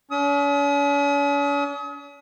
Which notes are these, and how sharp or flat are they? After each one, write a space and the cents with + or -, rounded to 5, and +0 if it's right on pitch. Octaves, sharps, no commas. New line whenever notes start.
C#4 +45 D#6 +35